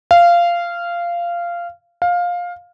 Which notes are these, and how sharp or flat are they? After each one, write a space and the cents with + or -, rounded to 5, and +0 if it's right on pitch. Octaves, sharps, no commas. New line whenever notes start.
F5 -15
F5 +15